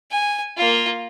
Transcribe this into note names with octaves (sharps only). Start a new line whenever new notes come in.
G#5
A#3 F4